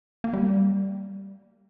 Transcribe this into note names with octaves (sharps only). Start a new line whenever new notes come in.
A#3
G3